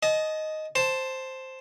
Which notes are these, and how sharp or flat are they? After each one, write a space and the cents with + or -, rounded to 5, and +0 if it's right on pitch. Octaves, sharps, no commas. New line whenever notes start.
D#5 +0 A5 -35
C5 +0 A5 +0